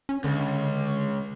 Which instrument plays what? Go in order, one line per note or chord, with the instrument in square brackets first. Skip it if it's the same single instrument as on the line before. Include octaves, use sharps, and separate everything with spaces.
[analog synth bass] C#4
[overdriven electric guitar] C#2 [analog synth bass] D3